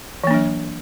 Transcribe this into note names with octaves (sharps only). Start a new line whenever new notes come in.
E3 F#3 A#3 D4